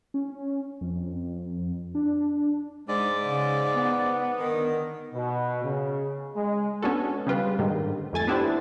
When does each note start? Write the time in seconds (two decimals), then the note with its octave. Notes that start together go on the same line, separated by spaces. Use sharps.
0.14 C#4
0.81 F2
1.95 D4
2.88 G#2 G#3 C5 D5
3.23 C#3
3.75 B3
4.39 D3 D#3
5.13 B2
5.64 C#3
6.36 G#3
6.83 B3 C#4 D4 F#4 A4
7.27 C#3 G3 F4 B4
7.59 G#2 D3 D#3 G3
8.13 F2 A3 G#5 A6
8.27 B3 D4 E4 G4 B4 C5